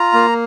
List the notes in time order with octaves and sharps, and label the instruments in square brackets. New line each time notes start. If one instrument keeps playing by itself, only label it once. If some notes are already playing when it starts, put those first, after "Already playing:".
Already playing: [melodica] F4 A#5
A#3